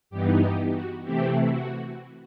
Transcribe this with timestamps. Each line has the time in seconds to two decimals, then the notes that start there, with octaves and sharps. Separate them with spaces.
0.10 G2 E3 B3 D#4 G4
0.42 G4
0.73 F#4
1.04 C3 E3 A3 C4 E4 G4
1.51 F#4